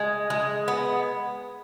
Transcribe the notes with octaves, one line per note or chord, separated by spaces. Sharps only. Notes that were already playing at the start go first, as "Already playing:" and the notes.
Already playing: G#3
G#3
B3